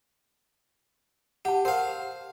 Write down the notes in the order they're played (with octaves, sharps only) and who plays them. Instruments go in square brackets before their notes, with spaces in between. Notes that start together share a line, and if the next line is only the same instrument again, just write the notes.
[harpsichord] G4 [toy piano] F#5 A5
[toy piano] A#4 F#5 [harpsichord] C5 F5